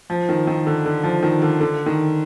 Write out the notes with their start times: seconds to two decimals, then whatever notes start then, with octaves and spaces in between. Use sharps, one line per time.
0.10 F3
0.29 D#3
0.47 D#3
0.67 D3
0.86 D3
1.03 F3
1.23 D#3
1.42 D3
1.61 D3
1.86 D#3